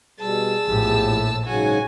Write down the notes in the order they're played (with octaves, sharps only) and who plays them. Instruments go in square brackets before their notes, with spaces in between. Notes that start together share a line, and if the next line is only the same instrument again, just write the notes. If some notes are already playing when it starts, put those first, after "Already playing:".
[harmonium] B2 G3 [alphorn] G#4 [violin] A5 E6
[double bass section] A#1 A2 [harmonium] E2 F3 G4
[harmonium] G#2 C#3 F#3 [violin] F#4 G#5